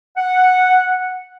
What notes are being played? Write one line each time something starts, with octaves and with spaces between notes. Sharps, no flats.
F#5